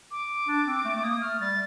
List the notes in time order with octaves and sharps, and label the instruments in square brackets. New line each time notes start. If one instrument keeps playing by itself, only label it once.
[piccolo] D6
[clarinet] D4
C4
A3
A3
[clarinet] A#3 [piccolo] D#6
[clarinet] A3 [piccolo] F6
[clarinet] G3 [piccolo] A6